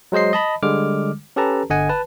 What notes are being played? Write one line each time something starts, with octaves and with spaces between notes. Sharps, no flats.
F#3 G#3 C5 D#5 C7
D#5 A5 B5
D3 G3 G#3 D6 F6
C#4 G4 A4 B4 A5 A#5
G1 D3 D#5 F#5 G#5
B4 A5